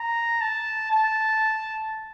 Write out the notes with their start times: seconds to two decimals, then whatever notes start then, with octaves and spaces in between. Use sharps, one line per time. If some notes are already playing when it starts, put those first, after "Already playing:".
Already playing: A#5
0.41 A5
0.91 A5